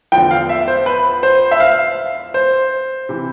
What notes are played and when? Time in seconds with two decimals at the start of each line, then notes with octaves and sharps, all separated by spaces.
0.12 E2 D3 F3 G5
0.31 F5
0.49 E5
0.68 C5
0.86 B4
1.23 C5
1.51 E5
1.60 F5
2.34 C5
3.09 C3 E3